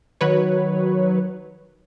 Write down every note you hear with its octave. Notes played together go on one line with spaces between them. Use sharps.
D#3 F#3 B4 C#5